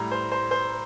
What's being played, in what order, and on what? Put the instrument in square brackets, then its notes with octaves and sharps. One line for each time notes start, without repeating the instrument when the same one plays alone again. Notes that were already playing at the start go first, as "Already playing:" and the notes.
Already playing: [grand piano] A2 G3 A#5
C5
C5
C5